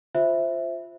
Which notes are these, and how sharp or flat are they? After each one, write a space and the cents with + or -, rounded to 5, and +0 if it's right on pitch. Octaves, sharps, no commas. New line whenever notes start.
F4 +0 C5 +0 E5 +0